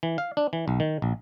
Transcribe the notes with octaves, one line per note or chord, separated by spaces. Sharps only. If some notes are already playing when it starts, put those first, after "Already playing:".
E3
F5
D4
E3
B1
D#3
A#1